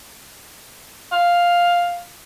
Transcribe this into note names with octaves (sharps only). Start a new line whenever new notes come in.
F5